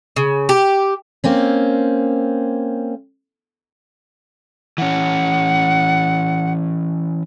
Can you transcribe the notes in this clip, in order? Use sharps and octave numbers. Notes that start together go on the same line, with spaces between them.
C#3
G4
A#3 C4 C#4
E3 C#4 F#5